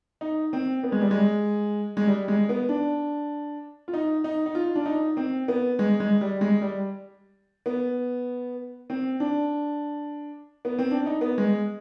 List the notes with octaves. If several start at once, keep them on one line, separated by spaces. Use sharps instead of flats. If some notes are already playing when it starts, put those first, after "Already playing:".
D#4
C4
B3
G#3
G3
G#3
G#3
G3
G#3
B3
D4
F4
D#4
D#4
D#4
F4
D4
D#4
C4
B3
G#3
G#3
G3
G#3
G3
B3
C4
D4
B3
C4
D4
D#4
B3
G#3